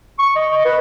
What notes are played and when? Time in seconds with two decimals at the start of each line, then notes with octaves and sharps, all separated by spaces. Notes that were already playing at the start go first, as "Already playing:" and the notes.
0.19 C#6
0.36 D#5
0.65 B4